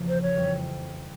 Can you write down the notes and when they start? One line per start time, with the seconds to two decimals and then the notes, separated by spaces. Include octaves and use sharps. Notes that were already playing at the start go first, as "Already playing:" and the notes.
Already playing: E2 C#3 F3 A#3
0.08 C5
0.22 C#5
0.36 F2 E3 G3